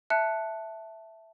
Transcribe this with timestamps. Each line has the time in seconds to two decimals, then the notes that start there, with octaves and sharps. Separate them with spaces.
0.10 E5 A5 F#6 C#7